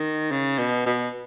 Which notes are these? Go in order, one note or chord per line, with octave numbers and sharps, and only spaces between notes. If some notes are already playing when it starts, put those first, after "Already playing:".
Already playing: D#3
C#3
B2
B2